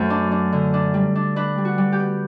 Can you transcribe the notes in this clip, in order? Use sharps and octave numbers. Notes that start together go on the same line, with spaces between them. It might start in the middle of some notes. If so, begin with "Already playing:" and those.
Already playing: F#2 F#3 A3 C5
D4
D4
D3
D4
G3
D4
D4 B4
G3
F#4
G3
G4
B3